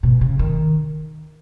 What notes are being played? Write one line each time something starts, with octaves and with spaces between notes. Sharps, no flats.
B2
C#3
D#3